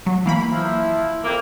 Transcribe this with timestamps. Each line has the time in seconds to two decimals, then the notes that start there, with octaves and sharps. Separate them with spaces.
0.06 F#3
0.25 E3 A#3 B5
0.52 F3 E4
1.24 F2 A#3